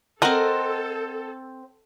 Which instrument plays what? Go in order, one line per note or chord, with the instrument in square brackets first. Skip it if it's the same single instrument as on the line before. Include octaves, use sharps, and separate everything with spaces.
[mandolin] C4 C5 [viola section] A4 [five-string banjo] A#4 [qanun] D#5 F#5